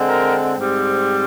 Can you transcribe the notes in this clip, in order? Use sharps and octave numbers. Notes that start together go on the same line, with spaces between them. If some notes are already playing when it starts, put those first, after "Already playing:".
Already playing: D3 G#3 C4
A#4
G#2 G3 C4